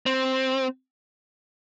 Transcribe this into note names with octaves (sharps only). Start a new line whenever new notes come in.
C4